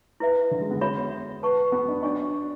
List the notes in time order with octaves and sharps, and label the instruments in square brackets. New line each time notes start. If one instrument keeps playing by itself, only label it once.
[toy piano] E4 B4 E5
[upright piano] D3
G#3
B3
[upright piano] B3 [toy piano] F#4 C#5 E5 B5
[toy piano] B4 F#5 A5 C#6
[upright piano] B3
D4
[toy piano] C#4 F#4 C#5 G#5 C#6 [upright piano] D4